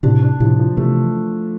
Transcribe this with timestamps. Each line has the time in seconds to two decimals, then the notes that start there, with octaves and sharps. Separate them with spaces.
0.03 A2 C3 D4
0.22 D4
0.40 A2 C3 F3
0.59 F3
0.77 C3 E3 A3